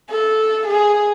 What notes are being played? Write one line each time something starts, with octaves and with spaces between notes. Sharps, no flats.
A4
G#4